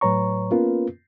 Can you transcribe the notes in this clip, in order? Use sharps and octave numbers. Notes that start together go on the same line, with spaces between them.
A2 F#3 B4 C#5 A#5 C#6
A#3 B3 C#4 F4 A#4 B4